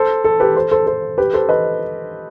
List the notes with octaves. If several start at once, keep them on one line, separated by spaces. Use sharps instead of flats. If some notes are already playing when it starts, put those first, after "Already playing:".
Already playing: A4 C5
A4
G4 B4
A4 C5
A4 C5
A4 C5
G4 B4
A4 C5
B4 D#5